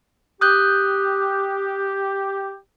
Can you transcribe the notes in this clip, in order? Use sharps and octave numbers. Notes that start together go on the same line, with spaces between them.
G4 D#6 F#6 G6